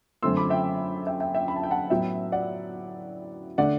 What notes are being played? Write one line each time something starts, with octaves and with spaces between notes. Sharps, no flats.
F#2 D3 A3 C4 C6 E6
B5 D6
E5 G5
E5 G5
E5 G5
E5 G5
B5
A5
G5
F#5 A5
A2 F#3 B3 E4 E5 G5
D5 F#5
D3 A3 D5 F#5